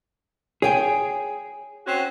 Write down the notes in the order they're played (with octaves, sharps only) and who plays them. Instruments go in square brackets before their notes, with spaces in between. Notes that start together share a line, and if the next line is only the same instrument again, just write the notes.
[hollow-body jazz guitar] G#4 [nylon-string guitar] C#5 G5 G#5
[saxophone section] C4 C#4 F#4